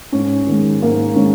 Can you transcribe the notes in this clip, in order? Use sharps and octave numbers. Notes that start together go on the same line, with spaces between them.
G#2 C#4
D#3 G#3
G#2 A#3
D#3 G#3 C#4